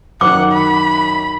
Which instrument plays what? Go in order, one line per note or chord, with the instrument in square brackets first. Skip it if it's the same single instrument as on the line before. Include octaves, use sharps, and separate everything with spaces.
[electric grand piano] F#2 D#3 [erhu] F#5 [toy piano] D6
[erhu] B5